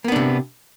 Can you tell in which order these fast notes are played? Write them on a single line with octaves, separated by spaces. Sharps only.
A#3 B3 D4 C3